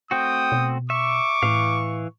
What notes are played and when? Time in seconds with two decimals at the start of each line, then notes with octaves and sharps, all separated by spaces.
0.11 A3 C4 F#4 G5 D#6
0.52 B2
0.90 E5 C#6 D6
1.43 A2 E3 F5